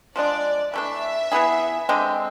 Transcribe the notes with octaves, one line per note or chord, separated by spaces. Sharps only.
F3 G#3 D4 D5
E3 A3 D4 E5
E3 B3 E4 G#4
D3 G#3 C4